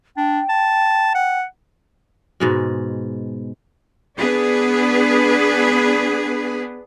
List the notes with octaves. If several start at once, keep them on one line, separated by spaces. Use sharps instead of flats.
D4 G5
A5
F#5
G#2 B2 G#3
B3 D4 G#4 B4